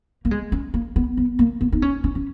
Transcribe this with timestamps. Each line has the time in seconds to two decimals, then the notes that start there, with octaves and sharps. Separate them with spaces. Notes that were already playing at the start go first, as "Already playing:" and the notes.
0.25 A#3
0.31 G#3
0.52 C#4
0.74 A#3
0.96 B3
1.17 B3
1.39 A#3
1.61 B3
1.72 D#4
1.82 C#4
2.04 C#4
2.15 C#4